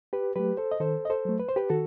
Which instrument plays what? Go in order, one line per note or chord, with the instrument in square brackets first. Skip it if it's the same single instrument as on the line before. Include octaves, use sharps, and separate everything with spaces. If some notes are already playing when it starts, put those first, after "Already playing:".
[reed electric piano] G4 B4
F#3 A3 G4 B4
A4 C5
D#5
D#3 A4 C5
D#5
A4 C5
F#3 A3
B4
C5
G4 B4
D#3 F#4 A4